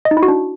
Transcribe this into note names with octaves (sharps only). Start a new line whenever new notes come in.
D#5
D#4
E4
F#4
D4